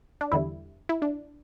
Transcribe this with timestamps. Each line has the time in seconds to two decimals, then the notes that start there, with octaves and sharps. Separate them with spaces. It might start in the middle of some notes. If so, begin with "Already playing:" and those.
0.21 D4
0.32 E2 D3 G3 E4
0.89 E4
1.02 D4